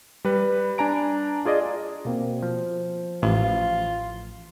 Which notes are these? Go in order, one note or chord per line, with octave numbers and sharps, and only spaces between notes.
G3 B4
D4 G#5 A#5 D7
F4 G#4 D5 D#5
B2 A#3 C4
F3
A1 F4